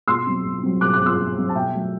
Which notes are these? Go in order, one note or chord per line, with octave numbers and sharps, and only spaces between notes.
B2 C6 E6
F#3 C4
B2
F#3 C4
B2 D6 F#6
D6 F#6
F#3 C4
C6 E6
B2
F#3 C4
A5
B2 E5 G5
F#3 A3